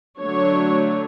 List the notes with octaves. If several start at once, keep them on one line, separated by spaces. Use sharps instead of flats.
D3 F#3 A3 D4 C#5